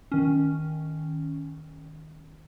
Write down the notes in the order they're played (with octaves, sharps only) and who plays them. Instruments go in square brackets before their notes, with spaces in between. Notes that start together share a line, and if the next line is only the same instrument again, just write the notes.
[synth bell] D#3 C#4